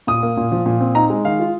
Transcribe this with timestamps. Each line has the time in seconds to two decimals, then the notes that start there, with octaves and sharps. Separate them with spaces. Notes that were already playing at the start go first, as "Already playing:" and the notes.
0.07 A#2 D#6
0.23 A#3
0.37 A#2
0.52 F3
0.66 A#2
0.81 C4
0.95 D#4 A#5
1.10 G#3
1.25 D#3 F5
1.40 F4